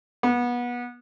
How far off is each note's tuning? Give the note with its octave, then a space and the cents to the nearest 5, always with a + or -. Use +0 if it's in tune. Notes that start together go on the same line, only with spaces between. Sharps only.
B3 -25